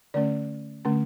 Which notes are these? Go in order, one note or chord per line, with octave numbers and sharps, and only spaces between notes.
D3 A3 C#4 D5
D3 A3 C#4